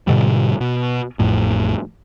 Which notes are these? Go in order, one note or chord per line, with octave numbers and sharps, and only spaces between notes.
G#2 B2 D3 G3
B2
A1 F2 A2